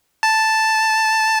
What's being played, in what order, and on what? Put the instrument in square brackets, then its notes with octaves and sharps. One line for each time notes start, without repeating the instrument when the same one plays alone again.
[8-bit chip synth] A5